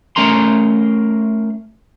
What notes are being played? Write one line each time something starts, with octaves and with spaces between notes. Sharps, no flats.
A3 C#4 A#4 A#5 C6